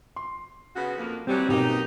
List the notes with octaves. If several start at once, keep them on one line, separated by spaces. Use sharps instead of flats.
C6
C#3 B3 F#4
F2 A#3
E3 F#3 G3 C4
B1 B2 A#3 D#4 G4